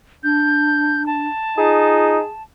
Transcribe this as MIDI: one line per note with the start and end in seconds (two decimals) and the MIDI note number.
0.24 1.28 62
0.24 1.05 91
1.06 2.43 81
1.58 2.20 63
1.58 2.17 65
1.58 2.29 68